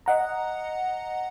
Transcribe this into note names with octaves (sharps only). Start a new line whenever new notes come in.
D#5 F#5 A#5